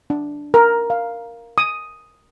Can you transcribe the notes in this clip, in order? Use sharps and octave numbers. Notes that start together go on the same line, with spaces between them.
D4
A#4
F5
D#6